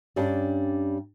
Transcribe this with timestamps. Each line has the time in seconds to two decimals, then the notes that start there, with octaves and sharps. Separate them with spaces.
0.16 G2 G3 C#4 D4